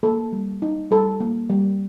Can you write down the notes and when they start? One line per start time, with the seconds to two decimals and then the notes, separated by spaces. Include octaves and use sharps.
0.03 A#3 A4
0.32 G3
0.62 D#4
0.91 G3 A4
1.20 A#3
1.50 G3